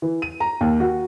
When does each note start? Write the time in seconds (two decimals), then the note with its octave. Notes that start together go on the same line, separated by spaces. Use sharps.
0.02 E3
0.22 D#7
0.40 A#5
0.61 D#2
0.80 F#4